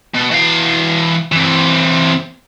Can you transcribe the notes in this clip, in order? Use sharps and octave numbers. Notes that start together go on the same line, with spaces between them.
B2
E3 F5
E3 C4